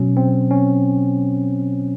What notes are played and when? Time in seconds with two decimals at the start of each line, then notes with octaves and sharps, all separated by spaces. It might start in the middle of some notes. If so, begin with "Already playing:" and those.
Already playing: B2 F#3 C#4
0.17 C4
0.51 C#4